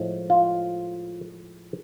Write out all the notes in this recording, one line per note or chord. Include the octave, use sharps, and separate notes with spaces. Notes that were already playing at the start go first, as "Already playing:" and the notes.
Already playing: A2 F3 G#3
F4